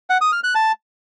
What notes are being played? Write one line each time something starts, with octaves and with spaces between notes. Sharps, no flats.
F#5
D#6
F6
F#6
A5